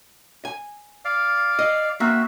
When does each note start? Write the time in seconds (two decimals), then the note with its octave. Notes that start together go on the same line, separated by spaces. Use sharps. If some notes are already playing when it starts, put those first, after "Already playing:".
0.45 G#5
1.05 D5 F5
1.59 D#5
2.00 A#3 C4 F#4 E5